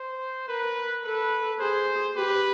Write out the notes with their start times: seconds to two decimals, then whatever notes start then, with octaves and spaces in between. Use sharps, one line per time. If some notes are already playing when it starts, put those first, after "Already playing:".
Already playing: C5
0.48 A#4 B4
1.04 A4 B4
1.59 G#4 C5
2.16 G4 B4